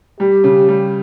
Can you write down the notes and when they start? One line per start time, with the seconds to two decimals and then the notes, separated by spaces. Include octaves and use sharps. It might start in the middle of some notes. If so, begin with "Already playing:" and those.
0.20 G3 G4
0.44 C#3
0.68 G3